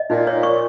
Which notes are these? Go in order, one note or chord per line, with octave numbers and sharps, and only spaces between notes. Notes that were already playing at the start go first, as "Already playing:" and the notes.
Already playing: D#5
A#2 D#4
C#5
C#6